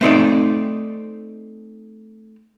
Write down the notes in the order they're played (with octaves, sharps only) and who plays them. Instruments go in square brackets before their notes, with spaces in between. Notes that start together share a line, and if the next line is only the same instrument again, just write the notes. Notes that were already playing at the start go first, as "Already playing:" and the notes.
[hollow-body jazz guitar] A3 C4 D#4 D5